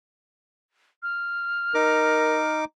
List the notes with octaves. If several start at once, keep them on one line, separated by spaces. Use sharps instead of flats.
F6
D#4 A#4 D6